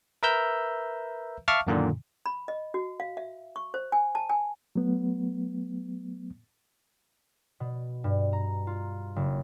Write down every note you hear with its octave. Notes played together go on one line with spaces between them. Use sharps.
A#4 B4 E5 A#5 E6 G6
E5 F5 A5 C#6 D6 F6
F#2 A#2 D3 D#3
B5
D#5
F#4
F5
E5
C#6
C5
G#5
A5
G#5
F#3 A3 B3
B2
G2
A#5
F4
F#1